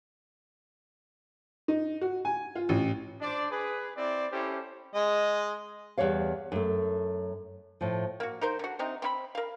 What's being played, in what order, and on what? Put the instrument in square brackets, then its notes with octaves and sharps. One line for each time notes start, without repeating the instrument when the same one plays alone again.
[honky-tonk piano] D#4
F#4
G#5
F4
A1
[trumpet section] D4 C5 D5
G#4 B4
C4 E4 D5
C#4 E4 G4 A4 C5
[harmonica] G#3 D#5
[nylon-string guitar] E2 C3 G3 C#5 F5
F#2 A3
A2 F3
[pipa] A#3 F#4
D#4 A#4 C5
D3 F#4
C3 C4 D#4
C4 F4 B5
A#4 F5